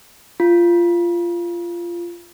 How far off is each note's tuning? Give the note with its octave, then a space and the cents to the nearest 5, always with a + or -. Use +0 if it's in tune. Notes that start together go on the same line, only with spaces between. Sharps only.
F4 -15